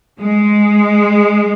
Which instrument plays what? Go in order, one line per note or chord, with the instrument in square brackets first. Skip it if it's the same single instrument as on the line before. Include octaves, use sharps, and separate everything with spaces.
[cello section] G#3